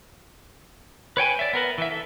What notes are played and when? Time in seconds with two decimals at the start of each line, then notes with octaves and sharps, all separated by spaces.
1.17 B4 C#5 G5 G#5
1.39 D5 E5
1.53 B3 A#4 B4
1.78 E3 E5
1.92 A4